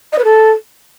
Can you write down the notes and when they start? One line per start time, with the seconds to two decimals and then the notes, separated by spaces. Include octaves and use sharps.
0.12 D#5
0.18 B4
0.24 A4